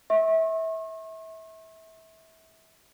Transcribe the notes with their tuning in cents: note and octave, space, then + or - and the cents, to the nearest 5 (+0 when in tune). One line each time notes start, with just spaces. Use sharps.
E5 -25 C#6 -40